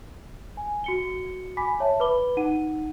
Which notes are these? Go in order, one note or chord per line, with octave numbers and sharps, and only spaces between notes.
G#5
F#4 C#7 G7
G#5 B5 D6 B6
C#5 E5 A5
B4 B5 D6 G7
D#4 F#5 D#7